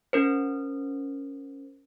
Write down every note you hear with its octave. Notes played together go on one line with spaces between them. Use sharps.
C#4 A#4 C5